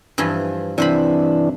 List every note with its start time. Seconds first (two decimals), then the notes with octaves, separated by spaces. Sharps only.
0.18 G2 E3 F3
0.78 C3 E3 D4 C5 B5